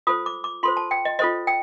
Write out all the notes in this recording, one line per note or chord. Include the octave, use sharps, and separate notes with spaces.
F4 A4 C5 D#6
D6
D6
F4 A4 C5 C6
A5
G5
D#5
F4 A4 C5 D#5
G5